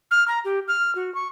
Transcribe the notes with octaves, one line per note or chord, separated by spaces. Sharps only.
F6
A#5
G4
F6
F#4
C#6